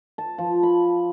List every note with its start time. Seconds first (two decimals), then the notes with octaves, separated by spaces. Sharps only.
0.18 A5
0.38 F3
0.63 B5